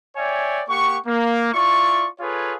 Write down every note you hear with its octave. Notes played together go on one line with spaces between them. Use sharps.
C#5 D5 E5 G5 G#5
A#3 G4 F#5 C#6
A#3
E4 F4 D5 C#6
F4 G#4 A4 B4 C#5 F5